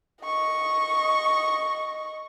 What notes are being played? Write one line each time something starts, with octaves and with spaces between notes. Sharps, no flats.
D#5 C#6